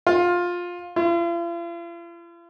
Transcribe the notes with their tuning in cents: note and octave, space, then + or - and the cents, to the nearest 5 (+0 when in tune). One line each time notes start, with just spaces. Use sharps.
F4 +15
F4 -45